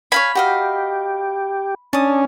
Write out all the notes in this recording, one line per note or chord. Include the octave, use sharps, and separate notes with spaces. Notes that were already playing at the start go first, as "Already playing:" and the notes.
C#5 F5 G#5 B5
F#4 G4 D#5 F5
C#4 D4 A5 D#6